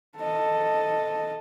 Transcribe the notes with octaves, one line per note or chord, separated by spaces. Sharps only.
A4 D#5